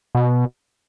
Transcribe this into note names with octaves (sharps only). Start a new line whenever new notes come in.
B2